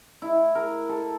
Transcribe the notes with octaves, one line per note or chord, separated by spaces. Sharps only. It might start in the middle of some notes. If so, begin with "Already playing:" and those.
E4
A#4
A4